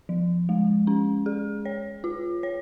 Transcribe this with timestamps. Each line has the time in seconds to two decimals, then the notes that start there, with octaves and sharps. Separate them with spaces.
0.09 F3
0.49 G#3
0.87 C#4
1.26 G#4
1.65 C#5
2.04 F4
2.43 C#5